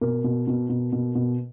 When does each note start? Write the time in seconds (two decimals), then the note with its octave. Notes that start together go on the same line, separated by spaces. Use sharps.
0.01 B2 A#4
0.24 B2
0.47 B2
0.69 B2
0.92 B2
1.15 B2